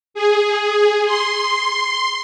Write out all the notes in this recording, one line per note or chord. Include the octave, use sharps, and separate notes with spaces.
G#4
C6